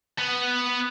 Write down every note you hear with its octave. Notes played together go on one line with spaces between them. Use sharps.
B3